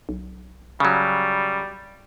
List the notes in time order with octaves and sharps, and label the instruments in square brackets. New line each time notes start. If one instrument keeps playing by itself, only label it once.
[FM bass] B1
[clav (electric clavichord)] C#3 F#3 [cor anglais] G3